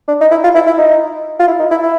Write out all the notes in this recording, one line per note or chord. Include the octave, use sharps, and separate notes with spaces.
D4
D#4
E4
F4
E4
E4
D#4
F4
E4
D#4
E4
E4